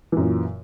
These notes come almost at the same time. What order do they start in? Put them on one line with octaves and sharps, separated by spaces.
E3 F#2 A#2